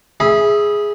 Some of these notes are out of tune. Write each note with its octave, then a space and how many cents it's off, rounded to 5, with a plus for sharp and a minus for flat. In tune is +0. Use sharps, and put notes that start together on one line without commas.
G#4 +0 E5 -5 B5 -25